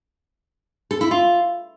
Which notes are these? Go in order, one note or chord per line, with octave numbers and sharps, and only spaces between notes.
A4
E4
F4